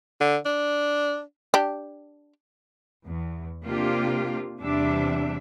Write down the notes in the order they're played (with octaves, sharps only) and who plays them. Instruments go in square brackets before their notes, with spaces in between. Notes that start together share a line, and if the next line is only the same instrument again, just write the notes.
[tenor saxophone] D3
D4
[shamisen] D4 G4
[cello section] E2
C3 A#3 D4 F4 G4
E2 C3 G3 D4 E5